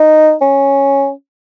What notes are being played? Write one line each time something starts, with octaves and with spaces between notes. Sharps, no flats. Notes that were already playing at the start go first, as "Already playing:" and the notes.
Already playing: D#4
C#4